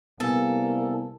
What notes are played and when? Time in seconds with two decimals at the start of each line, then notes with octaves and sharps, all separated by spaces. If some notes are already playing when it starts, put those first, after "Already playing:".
0.20 C2 A#3 B3 A4 G#5